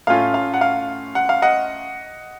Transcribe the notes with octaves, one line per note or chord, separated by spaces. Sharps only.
A2 A3 C#4 F4 F5
F5
F#5
F5
F#5
F5
D#5 F#5